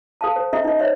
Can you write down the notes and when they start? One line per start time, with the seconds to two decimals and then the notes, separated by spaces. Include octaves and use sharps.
0.21 A4 F5 A5
0.36 C5
0.53 C#4 A4 D#5 E5 F#5 A#5
0.64 D#4 D#5
0.79 C5 C#5 E5